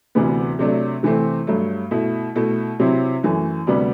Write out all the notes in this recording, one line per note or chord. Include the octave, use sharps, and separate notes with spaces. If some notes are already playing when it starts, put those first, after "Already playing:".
D2 C3 E3 B3
C3 F#3 A3 D4
C3 E3 A3 C4
G2 F#3 A3
B2 A3 E4
B2 A3 E4
C3 F#3 C4 E4
F#2 E3 A3
D2 C3 G3 B3 D4